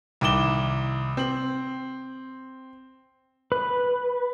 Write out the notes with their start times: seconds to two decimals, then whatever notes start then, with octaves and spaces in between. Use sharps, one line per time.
0.21 C2 D#3 E4 D6 E7 G7
1.17 C4 F#7
3.52 B4